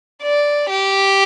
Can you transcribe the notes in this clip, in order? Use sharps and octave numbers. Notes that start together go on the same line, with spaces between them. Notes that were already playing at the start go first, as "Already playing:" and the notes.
D5
G4